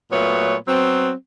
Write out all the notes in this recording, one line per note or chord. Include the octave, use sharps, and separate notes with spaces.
A#2 F#3 A3 B3 C#5
F#3 B3 C4